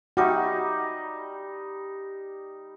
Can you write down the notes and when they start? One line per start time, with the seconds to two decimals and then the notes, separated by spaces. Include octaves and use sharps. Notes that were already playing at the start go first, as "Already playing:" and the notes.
0.17 G3 D#4 F#4 E5